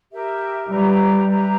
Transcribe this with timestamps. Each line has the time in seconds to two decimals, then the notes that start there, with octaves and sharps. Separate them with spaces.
0.11 G4 A#4 E5
0.68 G3 G4 B4 E5 A#5
1.26 G4 B4 E5 A#5